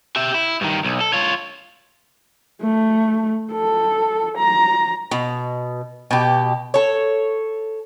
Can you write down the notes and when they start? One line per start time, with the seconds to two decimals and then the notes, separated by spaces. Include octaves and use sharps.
0.16 G4 E5
0.34 E4
0.61 G2 D#3
0.85 B1
1.01 A4
1.13 F4 C#5
2.62 A3
3.52 A4
4.38 A#5
5.11 B2
6.11 B2 G4
6.74 A4 C#5